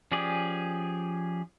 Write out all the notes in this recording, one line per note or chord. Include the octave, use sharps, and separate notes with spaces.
F3 C#4 G4 G#4 D5